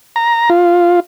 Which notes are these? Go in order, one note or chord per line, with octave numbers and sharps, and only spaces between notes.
A#5
F4